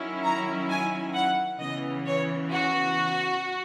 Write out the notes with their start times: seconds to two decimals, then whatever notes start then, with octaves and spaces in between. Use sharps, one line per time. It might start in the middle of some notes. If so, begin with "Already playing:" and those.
Already playing: D#3 F#3 C#4 E4
0.24 A#5
0.69 G#5
1.14 F#5
1.60 C#3 E3 B3 D#5
2.06 C#5
2.51 F#4